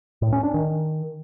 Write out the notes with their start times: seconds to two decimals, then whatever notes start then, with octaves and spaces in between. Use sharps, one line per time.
0.22 A2
0.33 C#4
0.43 D4
0.54 D#3